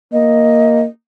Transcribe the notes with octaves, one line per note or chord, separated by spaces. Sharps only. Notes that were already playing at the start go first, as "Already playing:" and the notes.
A#3 D#5